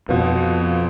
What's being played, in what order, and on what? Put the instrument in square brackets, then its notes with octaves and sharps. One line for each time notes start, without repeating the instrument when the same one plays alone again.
[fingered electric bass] F2 [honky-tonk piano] B2 F3